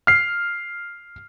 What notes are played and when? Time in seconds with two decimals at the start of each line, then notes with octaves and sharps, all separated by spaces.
0.07 F6 C7